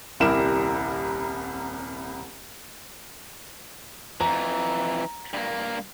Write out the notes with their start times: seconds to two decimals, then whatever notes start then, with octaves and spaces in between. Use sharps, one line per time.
0.20 D#1 C2 G3 E4 A#4 E7
4.21 F2 E3 A#5
5.34 G2 A#3